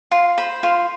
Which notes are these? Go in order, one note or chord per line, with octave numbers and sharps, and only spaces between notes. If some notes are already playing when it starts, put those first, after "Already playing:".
F4 C6
C5 B5
F4 C6